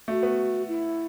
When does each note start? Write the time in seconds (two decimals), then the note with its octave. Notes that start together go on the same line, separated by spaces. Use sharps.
0.08 A3 F#4
0.23 B3
0.67 E4